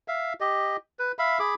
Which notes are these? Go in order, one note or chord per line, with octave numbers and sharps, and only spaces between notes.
E5 F5
G4 D#5
B4
E5 F5 B5
G#4 B5 D6